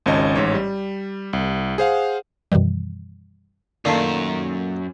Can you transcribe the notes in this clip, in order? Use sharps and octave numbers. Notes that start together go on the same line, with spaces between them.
G#1 C#2 C#4 D#5 A5
A1 G#2 C#5
G3
C2
G#4 C5 F5 F#5
F#2 B2 D#3 E3 G3
F#2 A#2 D#3 A3 D5 F5 A5